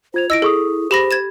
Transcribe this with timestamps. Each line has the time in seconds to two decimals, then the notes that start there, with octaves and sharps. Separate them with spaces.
0.14 F4 C5 G#6 F7
0.30 E4 D#5 E6 A#6 D7
0.42 G#4 A4 C#6 D#6
0.91 G4 C5 B5 A#6
1.11 G#6 A6 E7